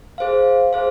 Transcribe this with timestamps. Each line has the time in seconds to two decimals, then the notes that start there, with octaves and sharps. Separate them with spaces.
0.18 G#4 C5 F5
0.73 G#4 C5 F5